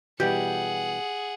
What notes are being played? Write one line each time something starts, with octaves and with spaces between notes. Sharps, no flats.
B2 E3 G3 G4 G#4 F#5